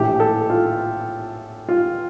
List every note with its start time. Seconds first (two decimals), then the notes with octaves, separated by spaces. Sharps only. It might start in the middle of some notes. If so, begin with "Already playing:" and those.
Already playing: A#1 A2 E3 A3 G4
0.20 A4
0.50 F4
1.69 F4